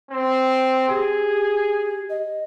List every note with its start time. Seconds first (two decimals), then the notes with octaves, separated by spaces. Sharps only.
0.11 C4
0.88 G4 G#4
2.09 D#5